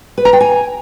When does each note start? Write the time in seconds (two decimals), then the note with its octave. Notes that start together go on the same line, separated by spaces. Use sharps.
0.18 B4
0.25 A#5
0.33 G5
0.40 G#5